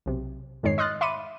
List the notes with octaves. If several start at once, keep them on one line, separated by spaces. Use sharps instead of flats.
B1 C3
F2 G#2 D#3 G#3 C#5 C7
D#5 C6 D#6 F6 F#6 A6
E5 B5 C6 D6 C#7 D#7